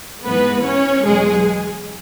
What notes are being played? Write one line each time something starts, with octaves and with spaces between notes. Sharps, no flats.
G#2 E3 B3 B4
C#4 C#5
E2 B2 F#3 G#3 G#4